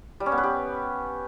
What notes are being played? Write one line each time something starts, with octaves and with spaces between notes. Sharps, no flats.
G3
C#4
B3
B4
G4